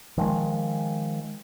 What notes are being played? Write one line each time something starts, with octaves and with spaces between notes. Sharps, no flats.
D#3 F3 G#3